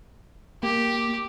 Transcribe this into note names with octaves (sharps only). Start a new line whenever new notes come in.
A#3 G4